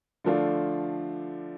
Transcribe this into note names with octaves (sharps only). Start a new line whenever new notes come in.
D3 F3 A3 D4 F4